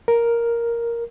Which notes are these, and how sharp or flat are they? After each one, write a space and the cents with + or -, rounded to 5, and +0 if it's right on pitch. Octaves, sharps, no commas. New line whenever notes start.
A#4 +5